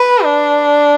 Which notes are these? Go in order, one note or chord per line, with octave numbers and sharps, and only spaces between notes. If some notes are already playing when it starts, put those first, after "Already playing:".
Already playing: B4
D4